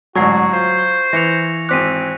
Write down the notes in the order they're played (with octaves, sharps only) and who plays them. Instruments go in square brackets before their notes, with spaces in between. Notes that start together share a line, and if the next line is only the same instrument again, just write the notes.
[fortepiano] A1 G#2 D3 [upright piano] F#3 [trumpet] F#4 [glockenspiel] C#6 G#6 C7
[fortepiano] F4 [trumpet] C5
[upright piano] E3 [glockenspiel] A#6 C#7 F7
[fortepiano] G#1 C4 D6 [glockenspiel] F#6 B6 D#7